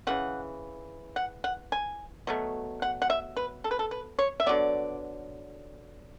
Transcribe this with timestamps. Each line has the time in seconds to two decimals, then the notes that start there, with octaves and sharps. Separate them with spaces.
0.07 C#3 E3 F#5
1.16 F#5
1.44 F#5
1.72 G#5
2.27 B2 F#3 A3
2.82 F#5
3.02 F#5
3.10 E5
3.36 B4
3.64 A4
3.71 B4
3.79 A4
3.91 B4
4.19 C#5
4.40 E5
4.46 D3 F#3 B3 D5